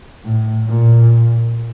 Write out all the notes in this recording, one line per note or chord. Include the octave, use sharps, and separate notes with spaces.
A2
A#2